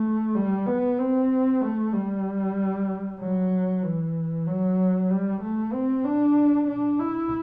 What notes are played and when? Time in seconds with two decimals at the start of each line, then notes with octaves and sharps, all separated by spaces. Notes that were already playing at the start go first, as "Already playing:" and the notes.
Already playing: A3
0.35 G3
0.66 B3
0.99 C4
1.61 A3
1.93 G3
3.20 F#3
3.83 E3
4.46 F#3
5.10 G3
5.41 A3
5.73 C4
6.04 D4
6.67 D4
6.99 E4